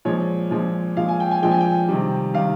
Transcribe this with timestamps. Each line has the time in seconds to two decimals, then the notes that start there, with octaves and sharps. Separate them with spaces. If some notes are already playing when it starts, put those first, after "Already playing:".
0.05 A#2 F3 G#3 C#5
0.51 A#2 F3 G#3
0.97 A#2 F3 G#3 F5
1.08 G#5
1.20 G5
1.31 G#5
1.43 A#2 F3 G#3 G5
1.51 G#5
1.61 G5
1.88 C3 D#3 G3
2.34 C3 D#3 G3 F5